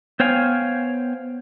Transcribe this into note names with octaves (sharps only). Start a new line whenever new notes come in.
B3 C5 C#5 F5 G5 G#5